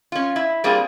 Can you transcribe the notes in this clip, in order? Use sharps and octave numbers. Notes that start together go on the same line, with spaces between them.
C#4 F4
E4
G3 A#3 C4 D4 F4 G#4